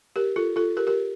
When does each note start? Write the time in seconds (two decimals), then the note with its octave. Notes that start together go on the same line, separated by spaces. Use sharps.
0.16 G4 A#4
0.36 F4 A4
0.56 F4 A4
0.77 G4 A#4
0.87 G4 A#4